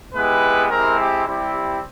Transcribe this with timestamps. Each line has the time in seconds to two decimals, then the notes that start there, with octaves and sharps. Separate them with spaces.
0.15 G#3 B3 E4 G4 B4
0.71 G#3 C4 E4 G4 A#4
0.99 G4
1.27 G3 C4 E4 G4
1.55 G4